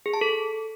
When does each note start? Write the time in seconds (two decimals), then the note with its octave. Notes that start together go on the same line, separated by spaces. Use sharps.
0.06 G#4
0.14 A5
0.21 A4